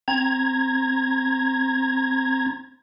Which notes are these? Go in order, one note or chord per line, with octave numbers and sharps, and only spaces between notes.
C4 A#5 G#6